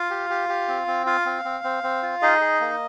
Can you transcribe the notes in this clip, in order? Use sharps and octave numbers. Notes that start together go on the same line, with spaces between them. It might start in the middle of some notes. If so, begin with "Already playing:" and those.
Already playing: F4 F5
G4
G4
G4
C4
C4
F4 F5
C4
C4
C4
C4
F4
D#4 G#4 D#5
G#4
A#3